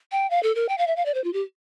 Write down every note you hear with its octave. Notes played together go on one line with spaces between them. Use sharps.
G5
F5
A4
A#4
G5
F5
E5
F5
D5
C5
F4
G4